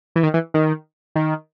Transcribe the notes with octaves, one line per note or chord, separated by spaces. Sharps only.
E3
D#3
E3
D#3
D#3